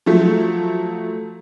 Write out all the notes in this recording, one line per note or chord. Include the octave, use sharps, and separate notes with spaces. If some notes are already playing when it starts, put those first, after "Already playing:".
F3 F#3 A3